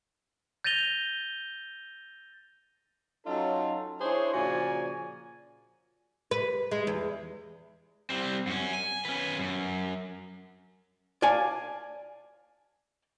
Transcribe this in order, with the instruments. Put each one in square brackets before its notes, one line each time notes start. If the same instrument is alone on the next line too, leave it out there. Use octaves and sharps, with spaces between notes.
[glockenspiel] G6 A6 A#6 D#7 F7 G7
[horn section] F#3 C#4 D#4 F4 A4
D4 E4 G#4 C5 C#5
A#2 C#3 F3 F#4 D5 G#5
[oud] B4
G#3
E2
[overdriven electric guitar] G3 C4
F#2 C#4
G#5
C#4 B4
F#2
[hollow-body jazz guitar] D5 F5 G#5 A5